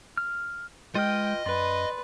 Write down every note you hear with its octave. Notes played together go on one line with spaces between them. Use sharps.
F6
G#3 F4 B4 D#5 G5 F6
F#2 B4 D5 C6